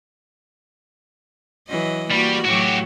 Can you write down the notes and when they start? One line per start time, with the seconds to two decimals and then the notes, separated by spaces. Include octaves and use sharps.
1.68 E3 F#3 D#5
2.11 G3 A#3 F#4
2.45 A2 F#3 F#4 G4